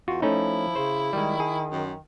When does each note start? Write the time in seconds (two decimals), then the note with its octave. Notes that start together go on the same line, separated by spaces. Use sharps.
0.08 E2 F4 F#4
0.22 F3 A3 C#4 D#4 E4
0.76 C#3 C5
1.13 D#3 G3 G#3
1.40 G#4
1.72 F#2